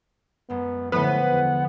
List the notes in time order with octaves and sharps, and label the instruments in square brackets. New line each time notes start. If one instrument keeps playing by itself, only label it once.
[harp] F#2 G#3 [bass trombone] B3
[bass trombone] A2 [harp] D3 F3 [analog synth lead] B3 [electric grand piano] B4
[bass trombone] E2